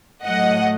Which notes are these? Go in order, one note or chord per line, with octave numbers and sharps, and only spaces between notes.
A2 F#3 A3 D#5 F#5